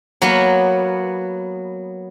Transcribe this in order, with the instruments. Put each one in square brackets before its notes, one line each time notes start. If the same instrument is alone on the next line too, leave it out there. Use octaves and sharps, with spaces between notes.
[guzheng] F#3 A#3 B3